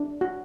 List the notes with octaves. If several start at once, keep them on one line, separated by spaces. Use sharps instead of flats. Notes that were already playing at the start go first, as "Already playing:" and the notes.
Already playing: D4
F#4